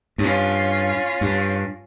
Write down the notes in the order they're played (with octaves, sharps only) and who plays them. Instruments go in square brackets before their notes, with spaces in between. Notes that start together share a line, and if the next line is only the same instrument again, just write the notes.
[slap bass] G2 [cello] C#4 F4
[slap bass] G2